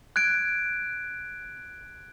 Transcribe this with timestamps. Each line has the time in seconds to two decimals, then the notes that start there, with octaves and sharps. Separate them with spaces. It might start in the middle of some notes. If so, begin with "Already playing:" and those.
0.16 F#6 G#6 D7